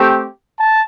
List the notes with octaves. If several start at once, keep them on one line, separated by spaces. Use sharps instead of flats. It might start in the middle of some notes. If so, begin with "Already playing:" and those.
Already playing: A3 C4 G4
A5